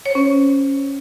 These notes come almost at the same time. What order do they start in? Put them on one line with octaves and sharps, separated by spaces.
C#5 C5 C#4